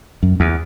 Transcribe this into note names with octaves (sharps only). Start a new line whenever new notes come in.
F#2
E2